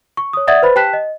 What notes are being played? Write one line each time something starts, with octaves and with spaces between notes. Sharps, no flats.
C#6
C#5 D#6
D5 E5 F#5 D#6 G#6 A6
B4 C5 B5 A6
G4 G5 A5 F#6 B6 E7
D#5